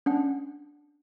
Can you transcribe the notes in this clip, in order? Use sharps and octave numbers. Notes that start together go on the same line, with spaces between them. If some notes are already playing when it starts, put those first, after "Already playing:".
C#4 D4 F#5